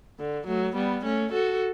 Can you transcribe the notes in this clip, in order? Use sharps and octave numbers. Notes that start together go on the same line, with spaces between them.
D3
F#3 A3
G3 B3
A3 C#4
F#4 A4